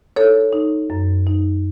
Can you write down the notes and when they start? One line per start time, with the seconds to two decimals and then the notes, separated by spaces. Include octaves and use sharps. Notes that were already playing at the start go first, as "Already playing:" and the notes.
0.16 D#4 A4 C#5
0.53 D#4
0.90 F#2
1.27 D#4